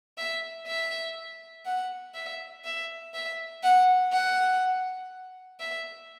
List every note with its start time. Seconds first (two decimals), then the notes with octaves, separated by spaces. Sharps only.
0.18 E5
0.67 E5
1.66 F#5
2.14 E5
2.65 E5
3.14 E5
3.63 F#5
4.12 F#5
5.60 E5